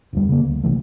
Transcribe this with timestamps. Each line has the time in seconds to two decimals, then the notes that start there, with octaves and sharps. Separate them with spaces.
0.13 D1 F2 G3
0.29 C#3 A#3
0.45 D2
0.63 A#1 C3 E3 A3